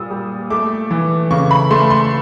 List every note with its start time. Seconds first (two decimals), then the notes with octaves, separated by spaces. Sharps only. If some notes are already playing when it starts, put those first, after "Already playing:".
Already playing: A#2 G3 D#6 E6
0.11 G3
0.50 A3 D6
0.91 E3
1.31 C#3 C#6
1.51 B5
1.70 A3 C6
1.90 C6